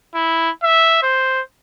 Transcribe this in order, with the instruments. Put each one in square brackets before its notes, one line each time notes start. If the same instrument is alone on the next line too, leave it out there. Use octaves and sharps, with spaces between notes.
[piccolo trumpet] E4
E5
C5